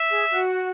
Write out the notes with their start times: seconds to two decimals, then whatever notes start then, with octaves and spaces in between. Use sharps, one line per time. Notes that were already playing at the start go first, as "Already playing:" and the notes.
Already playing: E5
0.10 G#4
0.30 F#4